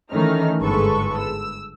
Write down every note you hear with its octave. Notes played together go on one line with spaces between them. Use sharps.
D#3 E3 A3 C#4 D#4 F6
G1 G#2 G#3 A4 B4 C#6
E6